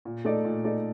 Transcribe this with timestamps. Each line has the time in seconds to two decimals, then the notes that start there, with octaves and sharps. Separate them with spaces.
0.05 A#2
0.25 A3 D#4 A4 D5
0.45 A#2
0.64 A3 D#4 A4 D5